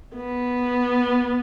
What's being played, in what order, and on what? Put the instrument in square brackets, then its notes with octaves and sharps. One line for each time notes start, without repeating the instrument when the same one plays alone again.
[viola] B3